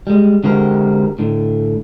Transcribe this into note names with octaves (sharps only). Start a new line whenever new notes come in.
G3 G#3
D3 G#3 C4 F#4 G4 A#4
A2 D3